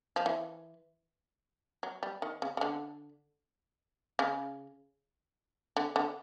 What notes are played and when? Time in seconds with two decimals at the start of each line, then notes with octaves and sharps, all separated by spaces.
0.16 F3
0.26 E3
1.83 F#3
2.03 G3
2.22 D#3
2.42 C#3
2.57 C#3
2.61 D3
4.19 C#3
5.76 D3
5.96 D3